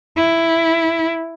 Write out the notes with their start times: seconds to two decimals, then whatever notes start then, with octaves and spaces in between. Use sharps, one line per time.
0.16 E4